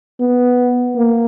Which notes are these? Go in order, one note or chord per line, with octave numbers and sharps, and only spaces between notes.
B3
A#3